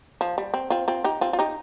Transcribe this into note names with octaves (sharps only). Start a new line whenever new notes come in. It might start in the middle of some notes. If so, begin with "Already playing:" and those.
F3
G3
C4
C4 F4
C4 F4
D#4 G4
C4 F4
F4
D#4 G4